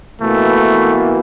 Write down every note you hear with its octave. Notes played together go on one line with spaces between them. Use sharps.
B2 E3 A3 A#3